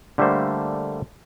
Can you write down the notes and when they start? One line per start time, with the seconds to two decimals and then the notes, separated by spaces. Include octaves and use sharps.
0.18 D3 G3 A3 A#3 C5